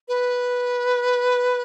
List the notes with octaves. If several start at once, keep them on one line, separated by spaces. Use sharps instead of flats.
B4